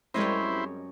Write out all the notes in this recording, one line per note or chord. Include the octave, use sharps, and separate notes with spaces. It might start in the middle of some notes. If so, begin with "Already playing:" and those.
F#2 G3 G#3 C4 E4 C5 C#5 D#5